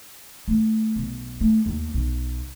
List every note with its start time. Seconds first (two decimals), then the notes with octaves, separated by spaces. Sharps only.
0.48 A3
0.96 B1
1.41 A3
1.66 D#2
1.94 B1